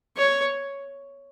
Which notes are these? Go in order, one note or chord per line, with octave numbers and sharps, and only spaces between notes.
C#5